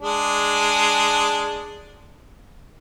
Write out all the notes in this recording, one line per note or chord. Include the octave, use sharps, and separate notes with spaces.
G#3 D4